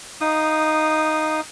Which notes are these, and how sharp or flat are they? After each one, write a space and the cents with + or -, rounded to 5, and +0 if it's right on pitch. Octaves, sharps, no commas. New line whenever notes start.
D#4 +0 F5 +0 D#6 -15